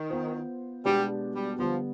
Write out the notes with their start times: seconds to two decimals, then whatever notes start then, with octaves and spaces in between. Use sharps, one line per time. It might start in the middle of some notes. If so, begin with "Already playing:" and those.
Already playing: D#3
0.10 B3 F4 C5
0.85 B2 G3 G#3 B3 D4 G4
1.34 G3
1.59 D3 F3 G3 B3